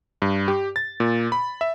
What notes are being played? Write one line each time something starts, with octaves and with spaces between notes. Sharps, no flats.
G2
G4
A6
A#2
B5
E5